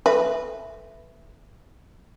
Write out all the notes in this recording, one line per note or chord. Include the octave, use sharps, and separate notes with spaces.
A4 B4 E5